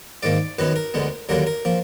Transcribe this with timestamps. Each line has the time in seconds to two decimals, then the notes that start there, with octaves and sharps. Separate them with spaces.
0.23 G#2 D#3 A#3 D5
0.59 F#2 D#3 F#3 B3 B4
0.76 A#4
0.94 D2 D3 G#3 B3
1.29 D#2 D3 F#3 A#3 A#4
1.47 A#4
1.65 F3 A#3